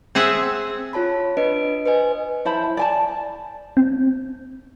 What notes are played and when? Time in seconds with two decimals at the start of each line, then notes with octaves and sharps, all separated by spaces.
0.15 C4 G#4 E5 F#5
0.93 F4 C#5 A5 B5
1.37 D4 B4 D#5 D7
1.86 B4 C5 D#5 G#5
2.45 E4 C5 A5 B5
2.77 D5 G#5 A5
3.77 C4